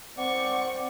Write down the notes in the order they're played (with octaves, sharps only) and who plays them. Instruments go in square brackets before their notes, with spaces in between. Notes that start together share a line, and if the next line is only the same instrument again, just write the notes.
[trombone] C4 [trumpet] D5 [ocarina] F#5 [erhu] C#6